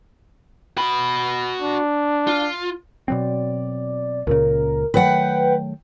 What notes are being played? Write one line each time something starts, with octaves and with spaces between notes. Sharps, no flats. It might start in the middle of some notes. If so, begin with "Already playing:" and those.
F#4 B5
D4
F4
B2 F#3 C4 D5
C#2 A#2 C#3 A#4
D#3 F#3 A3 B4 F#5 G5